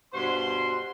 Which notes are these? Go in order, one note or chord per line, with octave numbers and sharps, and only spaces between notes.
G2 B2 C5 F#5 C6